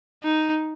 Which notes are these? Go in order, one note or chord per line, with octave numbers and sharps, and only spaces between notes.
D#4